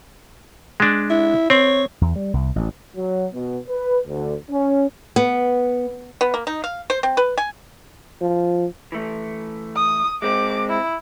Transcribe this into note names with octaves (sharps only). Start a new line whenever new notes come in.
G#3 D4
E4
C4 C#5
E2
G3
C2
A1
F#3
B2
B4
D2
C#4
B3
B3
A#3
D#4
F5
C5
C4
B4
G#5
F3
E3 A3
D#6
G#3 C4 D6
E4